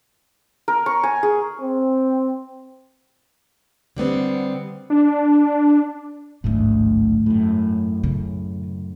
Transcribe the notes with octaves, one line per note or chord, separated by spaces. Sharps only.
A#4
C#6
G#5
G#4
C4
D3 G3 B3 C4
D4
D1 A1 D2 G#2 A3
F#2 A2
C#3